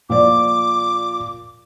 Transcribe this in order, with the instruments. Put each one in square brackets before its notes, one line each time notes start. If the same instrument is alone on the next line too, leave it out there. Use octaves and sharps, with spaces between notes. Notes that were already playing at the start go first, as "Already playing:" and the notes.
[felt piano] A#2 F3 D5 [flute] D6